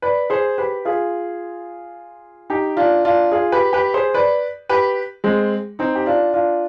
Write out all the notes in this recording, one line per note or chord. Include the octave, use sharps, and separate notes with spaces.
B4 D5
G#4 C5
G4 B4
F4 G#4
D#4 G4
D4 F4
D4 F4
F4 G#4
G4 B4
G4 B4
G#4 C5
B4 D5
G4 B4
G#3 C4
C4 D#4
G4
D4 F4
D4 F4